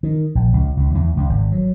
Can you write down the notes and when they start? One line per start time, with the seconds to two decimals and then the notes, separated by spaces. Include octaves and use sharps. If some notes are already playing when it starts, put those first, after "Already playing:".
0.03 D#3
0.35 A#1
0.54 C#2
0.77 C#2
0.95 E2
1.17 C#2
1.29 G#1
1.52 F#3